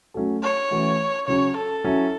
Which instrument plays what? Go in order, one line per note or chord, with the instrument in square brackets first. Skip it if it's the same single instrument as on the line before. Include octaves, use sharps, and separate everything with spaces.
[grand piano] F#3 A3 C#4 F#4 A4
[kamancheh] C#5
[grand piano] E3 A3 C#4 F#4
[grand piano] C#3 F#3 C#4 [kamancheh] C#5
[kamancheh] A4
[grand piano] F#3 C#4 E4